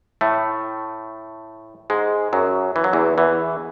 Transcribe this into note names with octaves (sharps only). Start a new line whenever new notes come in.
A2 A3
G#2 G#3
F#2 F#3
E3
F#3
E2 E3
E2 E3